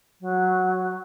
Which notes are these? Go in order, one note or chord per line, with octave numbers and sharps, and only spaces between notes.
F#3